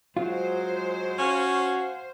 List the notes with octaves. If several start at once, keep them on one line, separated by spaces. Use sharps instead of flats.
F#3 G#3 F4 C5
C#4 F#4 F5